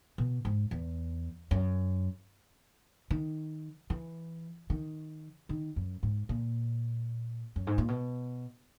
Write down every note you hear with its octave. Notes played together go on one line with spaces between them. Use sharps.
B2
G#2
E2
F#2
D#3
E3
D#3
D#3
F#2
G#2
A#2
F#2
G#2
A#2
B2